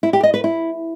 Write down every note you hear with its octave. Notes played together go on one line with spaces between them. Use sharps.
E4
G4
D#5
B4
E4